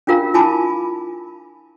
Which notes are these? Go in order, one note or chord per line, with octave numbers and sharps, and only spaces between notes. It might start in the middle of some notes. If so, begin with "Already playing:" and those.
C#4 D4 F4 A#4 F5 A#5
E4 F4 G#5 A5 B5 D6